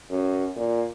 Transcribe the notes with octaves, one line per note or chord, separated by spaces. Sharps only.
F#2
A#2